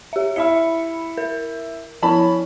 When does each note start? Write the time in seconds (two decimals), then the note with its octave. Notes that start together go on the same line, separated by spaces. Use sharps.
0.13 G4 E5
0.36 E4 E5 B5 C#7
1.17 A#4
2.02 F3 C#4 E4 A5 B5